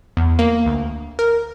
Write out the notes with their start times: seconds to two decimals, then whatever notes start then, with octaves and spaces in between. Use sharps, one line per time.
0.17 E2
0.39 A#3
0.66 D2
1.19 A#4